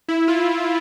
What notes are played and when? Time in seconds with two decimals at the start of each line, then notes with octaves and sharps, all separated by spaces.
0.08 E4
0.28 F4